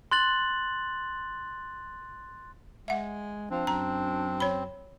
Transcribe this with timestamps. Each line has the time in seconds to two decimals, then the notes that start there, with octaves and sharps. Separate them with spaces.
0.11 C6 F#6 A6 F#7
2.88 G#3 E5 F#5
3.51 F3 C4 D4
3.67 F#2 A#5
4.40 C#5 B5